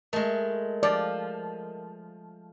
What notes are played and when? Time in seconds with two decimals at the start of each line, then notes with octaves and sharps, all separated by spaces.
0.13 G#3 A3 A#4 D#5
0.83 F3 D5